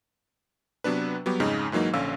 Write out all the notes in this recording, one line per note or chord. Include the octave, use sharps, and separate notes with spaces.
C3 F#3 B3 D4 B4
F#3 G3 B3 G4
F2 G#2 C#3 D#4
G#2 E3 F#3 A#3 D#4
A#1 D3 C#4 F5 E6